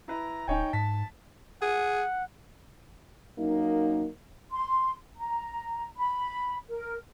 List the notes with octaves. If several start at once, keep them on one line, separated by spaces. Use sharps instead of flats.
E4 B4 A#5
D1 D#4 C#5 G5 G#5
G#2 A5 B6
G#4 F#5
F#2 A#3 D#4
C6
A#5
B5
A#4